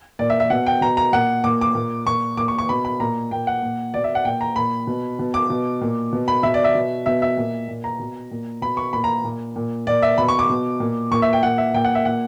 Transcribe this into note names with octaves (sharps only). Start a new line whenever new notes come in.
A#2 D5
E5
E5
B2 F#5
G5
B2 A#5
A#5
A#2 F#5
A#2 D6
D6
A#2
A#2 C#6
A#2 D6
C#6
C#6
B2 B5
B5
A#2 A#5
A#2 G5
F#5
A#2
B2 D5
E5
F#5
A#2 G5
A#5
A#2 B5
B2
B2
D6
B2
A#2
B2
B5
B2 E5
D5
E5
B2
B2 E5
E5
A#2
A#2
A#5
B2
A#2
B2 B5
C#6
A#2 B5
A#5
A#2
A#2
A#2 D5
E5
B2 B5
C#6
D6
B2
A#2
A#2 C#6
E5
G5
A#2 F#5
E5
A#2 G5
F#5
E5
A#2 F#5